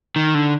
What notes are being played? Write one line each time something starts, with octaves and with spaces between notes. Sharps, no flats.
D#3
D3